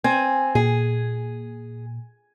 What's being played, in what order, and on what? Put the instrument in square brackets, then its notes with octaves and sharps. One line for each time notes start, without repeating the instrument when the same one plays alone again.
[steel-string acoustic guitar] C4 [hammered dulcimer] G#5
[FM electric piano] A#2 [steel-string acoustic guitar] G#4